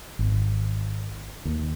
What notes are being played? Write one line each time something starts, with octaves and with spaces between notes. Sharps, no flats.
G#1
D#2